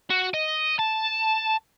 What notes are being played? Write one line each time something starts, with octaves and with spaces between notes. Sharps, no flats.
F#4
D#5
A5